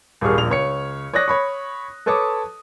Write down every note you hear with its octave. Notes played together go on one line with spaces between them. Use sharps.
D#1 G#1 G3 G#4 C#6 F6
D#1 A#1 F7
C#2 C#5 C#7
C#5 D5 D#6 F#6 A#6
C#5 B5 C#6
A4 B4 C#5 A5 D6 D#6